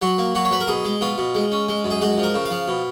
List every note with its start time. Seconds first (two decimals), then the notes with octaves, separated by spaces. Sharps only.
0.02 F#3 F#4
0.18 A#3
0.35 F#3 F#4
0.45 C#5
0.51 F#3 B4
0.61 A#4
0.68 B2 G#4
0.85 G#3
1.01 B2 F4
1.18 B2
1.35 G#3
1.52 C#4
1.69 G#3
1.85 F#2
1.90 G#4
2.01 G#3 F#4
2.18 F3
2.23 A#4
2.34 C#3
2.45 F5
2.51 F3
2.68 B2